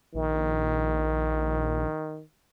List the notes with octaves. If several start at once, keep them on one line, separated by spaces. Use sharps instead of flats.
A#1 D#3